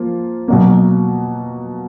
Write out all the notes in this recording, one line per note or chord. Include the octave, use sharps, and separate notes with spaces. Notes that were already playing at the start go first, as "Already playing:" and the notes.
Already playing: F3 A#3 F4
B2 F#3 A#3